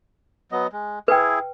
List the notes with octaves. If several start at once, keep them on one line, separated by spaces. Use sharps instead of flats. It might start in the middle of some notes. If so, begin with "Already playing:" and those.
F#3 B3 D#5
G#3
E4 G#4 B4 G5